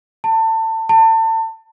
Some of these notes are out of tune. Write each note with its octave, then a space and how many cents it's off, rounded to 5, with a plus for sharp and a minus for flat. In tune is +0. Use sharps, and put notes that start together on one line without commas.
A5 +25
A5 +30